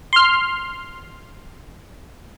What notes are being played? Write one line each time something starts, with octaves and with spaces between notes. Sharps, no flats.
C6 F6